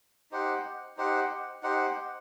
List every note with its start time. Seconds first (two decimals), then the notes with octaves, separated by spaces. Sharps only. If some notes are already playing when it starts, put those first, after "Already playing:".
0.31 D#4 G4 C5 F#5
0.97 D#4 G4 C5 F#5
1.63 D#4 G4 C5 F#5